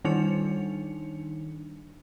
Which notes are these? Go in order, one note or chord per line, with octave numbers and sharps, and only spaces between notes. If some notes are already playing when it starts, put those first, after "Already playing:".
D#3 G3 D4 D#4 C#7 F7